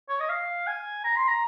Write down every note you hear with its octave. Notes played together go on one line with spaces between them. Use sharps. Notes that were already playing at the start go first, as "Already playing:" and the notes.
C#5
D#5
F5
G#5
A#5
C6
A#5